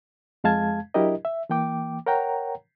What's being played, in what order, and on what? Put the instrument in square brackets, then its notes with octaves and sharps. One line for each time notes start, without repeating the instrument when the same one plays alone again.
[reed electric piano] F2 G#3 F5 A5 G#6
F#3 D4 E4 G4 A#4 D#5
E5
E3 A#3 G5 D6
A#4 C#5 F#5 G5 A#5